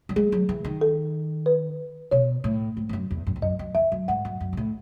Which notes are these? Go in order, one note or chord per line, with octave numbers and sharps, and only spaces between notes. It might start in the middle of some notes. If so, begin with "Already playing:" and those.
F#3
G#3 G#4
F#3
E3
D#3
A4
B4
B2 C#5
A2
G#2
E2
F#2
E2
F#2
E2
F#2 D#5
F#2
E2 E5
F#2
G#2 F#5
F#2
F#2
G#2
A2